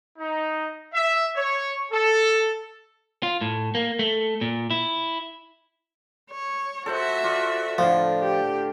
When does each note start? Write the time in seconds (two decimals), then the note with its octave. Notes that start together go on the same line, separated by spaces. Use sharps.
0.18 D#4
0.93 E5
1.36 C#5
1.91 A4
3.23 F4
3.41 A2
3.75 A#3
3.99 A3
4.41 A#2
4.70 E4
6.30 C#5
6.86 F#4 A4 C5 E5 F#5
7.23 F4 D5
7.78 A2 D3 F3
8.19 G4